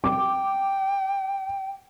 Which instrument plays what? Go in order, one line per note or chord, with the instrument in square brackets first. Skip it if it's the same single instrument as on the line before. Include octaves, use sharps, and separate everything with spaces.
[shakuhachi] G5 [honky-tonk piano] D6